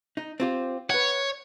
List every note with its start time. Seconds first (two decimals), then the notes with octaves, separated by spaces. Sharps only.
0.17 D#4
0.40 C4 F4 G4
0.90 B4 C#5 F#5